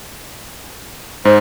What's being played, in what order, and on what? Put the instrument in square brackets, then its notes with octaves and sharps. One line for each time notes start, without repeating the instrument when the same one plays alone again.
[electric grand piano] G#2 [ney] C5